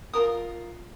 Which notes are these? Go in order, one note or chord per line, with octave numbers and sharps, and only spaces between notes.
F4 A4 A#4 D#6